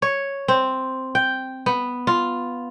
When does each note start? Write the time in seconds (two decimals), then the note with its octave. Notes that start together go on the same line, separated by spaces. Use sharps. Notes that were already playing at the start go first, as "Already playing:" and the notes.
0.02 C#5
0.48 C4
1.15 G5
1.66 B3
2.07 F4